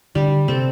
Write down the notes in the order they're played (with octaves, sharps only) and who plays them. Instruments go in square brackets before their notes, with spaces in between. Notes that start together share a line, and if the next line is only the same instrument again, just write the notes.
[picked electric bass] D3 [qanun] G3
[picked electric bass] C3 [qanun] C4 A4